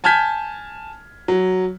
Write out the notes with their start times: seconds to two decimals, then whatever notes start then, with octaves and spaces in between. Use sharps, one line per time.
0.04 G#5 A5 F6 G6 G#6 B6
1.28 F#3